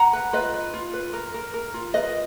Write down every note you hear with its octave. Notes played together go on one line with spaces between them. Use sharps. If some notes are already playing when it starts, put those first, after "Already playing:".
Already playing: F#5 A#5
B4
F4 B4 D#5
B4
F4
B4
A#4
A#4
A#4
F4
F4 B4 D#5